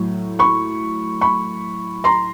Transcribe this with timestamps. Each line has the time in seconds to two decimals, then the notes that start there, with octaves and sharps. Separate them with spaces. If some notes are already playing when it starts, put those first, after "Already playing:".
Already playing: A2 F#3
0.39 B5 C#6
1.21 B5 C#6
2.04 A#5 C6